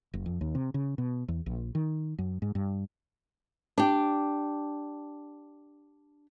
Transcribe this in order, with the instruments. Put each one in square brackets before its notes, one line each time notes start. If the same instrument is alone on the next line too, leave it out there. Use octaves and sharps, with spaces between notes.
[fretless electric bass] F#1
F2
D#2
C3
C#3
B2
E2
A#1
D#3
F#2
G#2
G2
[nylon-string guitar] D4 G4